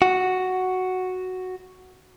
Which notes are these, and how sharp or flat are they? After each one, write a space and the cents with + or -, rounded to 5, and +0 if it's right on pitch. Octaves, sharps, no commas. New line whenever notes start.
F#4 +0